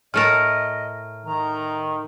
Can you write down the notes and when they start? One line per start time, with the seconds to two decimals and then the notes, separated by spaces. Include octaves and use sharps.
0.14 A2 A3 A#4 D#5 F6
1.26 D#3 A#5